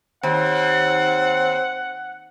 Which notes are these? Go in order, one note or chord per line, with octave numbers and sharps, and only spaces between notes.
D#2 C4 F#5